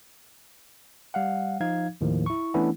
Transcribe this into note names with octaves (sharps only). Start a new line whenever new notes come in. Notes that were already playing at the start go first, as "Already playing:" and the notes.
G3 F5 F#5
F3 D#4 F5 G#6
D#2 A2 D#3 F3
E4 C#6
E3 A3 B3 C#4 D4 E4